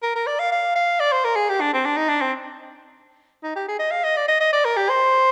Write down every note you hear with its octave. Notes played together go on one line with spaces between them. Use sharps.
A#4
A#4
D5
F5
F5
F5
D5
C5
A#4
G#4
G4
D4
C4
D4
D#4
D4
C4
D#4
G4
G#4
D#5
F5
D#5
D5
D#5
D#5
D5
A#4
G4
C5